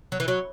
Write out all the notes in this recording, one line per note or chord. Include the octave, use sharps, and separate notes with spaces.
F#3
E3
F#3